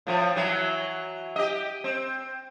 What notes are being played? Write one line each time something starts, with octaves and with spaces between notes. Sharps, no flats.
A2 F3
E3 F#3
G4 D#5
C4